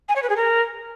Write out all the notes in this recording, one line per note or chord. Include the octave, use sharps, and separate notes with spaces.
G#5
C#5
B4
G#4
A#4